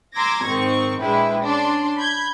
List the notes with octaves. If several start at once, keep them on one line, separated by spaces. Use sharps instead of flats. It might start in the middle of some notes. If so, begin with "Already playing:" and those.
A#5 C6 D6 E6 G#6 A#6
G#2 D#3 C4 C#6
A#1 G#3 D4 E4 B4 G5
C#4 D4 C6
B5 G6 G#6